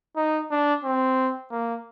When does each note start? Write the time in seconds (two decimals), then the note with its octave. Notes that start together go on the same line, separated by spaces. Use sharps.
0.17 D#4
0.51 D4
0.84 C4
1.51 A#3